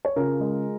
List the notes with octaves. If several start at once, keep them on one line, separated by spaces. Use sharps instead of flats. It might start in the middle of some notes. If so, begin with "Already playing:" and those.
C#5
C#3 F4 A#4
G#3